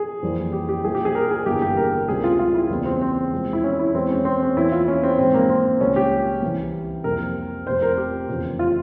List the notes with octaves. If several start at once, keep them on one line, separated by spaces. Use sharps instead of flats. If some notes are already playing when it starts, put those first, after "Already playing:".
Already playing: G#4
F2 E3 G3 A#3
G4
G4
A#1 A#2 G3 A#3 G#4
G4
G#4
A#4
G#4
G1 G2 E3 A#3 G4
G4
A#4
A#4
C#2 C3 G3 G#4
F4
F4
E4
E2 C#3 G3 A#3
C4
C4
E2 C3 F3 G#3
E4
C#4
E4
E2 E3 G#3 C4
C#4
C4
C#4
E2 E3 A#3 E4
F4
C#4
C4
A#1 G#2 E3 G#3 C4
A#3
C4
C#2 C#3 G3 A#3 C#4
G4
C2 C3 E3
F2 C3 G3 A#3 A#4
F1 F2 C3 C5
A#4
G4
F1 E2 C#3 F3
F4